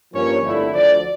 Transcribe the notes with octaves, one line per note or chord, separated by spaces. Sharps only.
G2 F3 A#3 C#4 C#5
G1 F2 D3 A3 E4
D2 D3 F3 D5